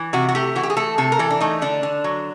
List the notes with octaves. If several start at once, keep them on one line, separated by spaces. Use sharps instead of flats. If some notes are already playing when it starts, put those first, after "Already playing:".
Already playing: E3
C3 F#4
F#4
A3 G4
E3 F#4
G4
G#4
A3 A4
C3 A4
A#4
E3 A4
D4
A3 D#4
D3 D4
D3
F#3